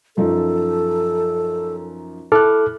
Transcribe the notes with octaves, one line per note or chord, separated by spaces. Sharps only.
F#2 F3 D#4 A4
E4 A4 D6 F6 F#6